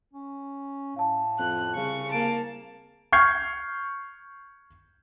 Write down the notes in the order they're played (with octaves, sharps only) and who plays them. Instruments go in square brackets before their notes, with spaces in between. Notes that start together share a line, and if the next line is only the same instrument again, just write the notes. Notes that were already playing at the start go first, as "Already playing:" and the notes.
[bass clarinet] C#4
[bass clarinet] A2 [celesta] F5 A5
[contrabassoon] F2 [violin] F#6
[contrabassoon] C2 [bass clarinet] C#3 [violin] C#6
[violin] A#3 A5 [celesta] D7
[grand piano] C#6 F6 G6 G#6 C7